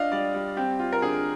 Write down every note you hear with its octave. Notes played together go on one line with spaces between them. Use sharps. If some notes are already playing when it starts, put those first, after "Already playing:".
Already playing: D4 F4 D#5 F5
G3 D5
G3
C4 G4
F4
A#4
D3 G#4